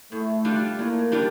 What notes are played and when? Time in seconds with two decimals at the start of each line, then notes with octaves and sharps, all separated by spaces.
0.11 A2 A3
0.45 G3 D4 F4
0.79 A2 A#3
1.12 G3 D4 F4